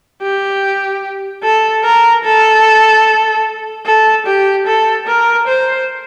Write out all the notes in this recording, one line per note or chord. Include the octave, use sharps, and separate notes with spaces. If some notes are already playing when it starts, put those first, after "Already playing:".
G4
A4
A#4
A4
A4
G4
A4
A#4
C5